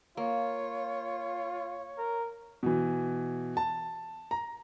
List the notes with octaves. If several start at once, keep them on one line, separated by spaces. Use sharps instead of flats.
A#3 F4 C#5
A#4
B2 E3
A5
A#5